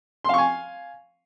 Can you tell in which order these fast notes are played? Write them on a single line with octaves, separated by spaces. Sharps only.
C6 F5 C#6 G#5